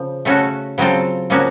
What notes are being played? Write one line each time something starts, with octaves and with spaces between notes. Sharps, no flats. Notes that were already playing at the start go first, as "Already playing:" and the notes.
Already playing: C#3 F3
C#3 A3 C#4 F#4 A4
C#3 F#3 C4 F4 A4
C#3 F3 A#3 C#4 F#4